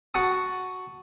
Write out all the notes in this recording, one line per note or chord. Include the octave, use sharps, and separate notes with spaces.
F#4 F#5 A5 D#6